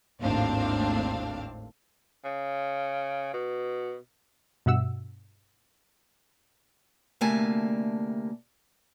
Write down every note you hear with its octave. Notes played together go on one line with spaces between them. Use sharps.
G#1 D#2 A2 C4 D4 F5
C#3
B2
G2 B2 E5 F#5 E6
D2 C3 A3 A#3 G#5 A5